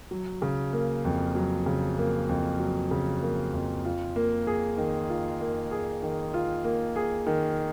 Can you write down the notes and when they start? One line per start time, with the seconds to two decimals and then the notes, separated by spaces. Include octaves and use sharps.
0.11 F#3
0.42 C#3
0.73 A#3
1.05 F2
1.35 F#3
1.66 C#3
1.98 A#3
2.29 F2
2.59 F#3
2.91 C#3
3.22 A#3
3.53 F2
3.85 F4
4.16 A#3
4.47 G#4
4.78 D#3
5.09 F4
5.41 A#3
5.71 G#4
6.03 D#3
6.34 F4
6.64 A#3
6.96 G#4
7.26 D#3